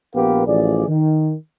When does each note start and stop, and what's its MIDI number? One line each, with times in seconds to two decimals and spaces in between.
0.15 0.43 34
0.15 0.43 59
0.15 0.43 67
0.15 0.43 70
0.15 0.43 71
0.15 0.43 77
0.47 0.85 33
0.47 0.85 53
0.47 0.85 68
0.47 0.85 74
0.88 1.35 51